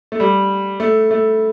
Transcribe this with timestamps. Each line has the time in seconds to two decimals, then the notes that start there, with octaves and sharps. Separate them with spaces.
0.12 A3
0.20 G3
0.80 A3
1.11 A3